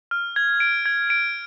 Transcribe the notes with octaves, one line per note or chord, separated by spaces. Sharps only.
F6
G#6
D7
G#6
D7